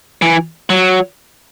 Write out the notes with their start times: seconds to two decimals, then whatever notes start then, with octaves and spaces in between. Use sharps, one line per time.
0.22 E3
0.70 F#3